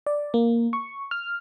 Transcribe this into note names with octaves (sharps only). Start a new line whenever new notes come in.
D5
A#3
C#6
F6